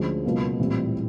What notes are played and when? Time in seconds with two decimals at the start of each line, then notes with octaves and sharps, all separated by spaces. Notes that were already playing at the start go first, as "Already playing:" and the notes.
Already playing: D2 D3 F3 G#3 C#4
0.24 C#2 B2 F#3 A#3
0.59 A#1 A2 E3 G3 C4